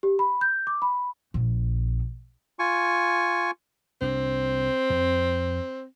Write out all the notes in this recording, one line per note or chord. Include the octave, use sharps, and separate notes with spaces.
G4
B5
G6
D6
B5
A#1
F4 G#5 C#6
C2 C4 D4
F2